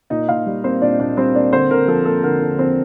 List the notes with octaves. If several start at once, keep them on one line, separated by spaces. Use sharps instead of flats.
A#2 D#4 D#5
A#2 F4 F5
G3
A#3 C4 C5
A#2 D4 D5
A#2 D4 D5
G3 C4 C5
A#3 D4 D5
D3 C4 C5
D3 A#4
F3 A4
A#3 A4
D3 A#4
D3
F3 C4 C5